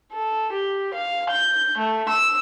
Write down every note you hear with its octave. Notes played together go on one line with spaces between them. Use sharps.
A4
G4
F5
G6
A3
E6